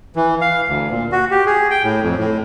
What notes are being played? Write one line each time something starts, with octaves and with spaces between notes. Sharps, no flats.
E3
F5
D2
A#2
F#4
G4
G#4
G5
A2
F2
A2